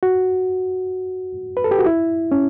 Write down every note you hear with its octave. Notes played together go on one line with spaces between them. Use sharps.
F#4
B4
A4
G4
F#4
E4
C#4